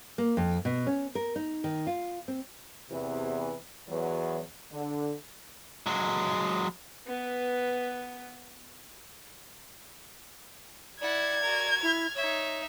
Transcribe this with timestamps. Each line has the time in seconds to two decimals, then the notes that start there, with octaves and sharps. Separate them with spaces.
0.18 A#3
0.37 F2
0.65 B2
0.87 C#4
1.15 A#4
1.36 D#4
1.64 D#3
1.87 F4
2.28 C4
2.90 E2 C3 E3
3.89 E2 E3 F#3
4.71 D3
5.86 F#3 G#3
7.07 B3 B4
11.01 E4 D5 F#5 G#6
11.42 F#4 A#4
11.83 E4 F6
12.15 D#4 C#5 E5